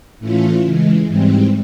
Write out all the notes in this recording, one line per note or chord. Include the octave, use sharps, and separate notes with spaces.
A2 E3 A3 C#4 F4
C#3 E3 G#3
G#2 E3 G3 C4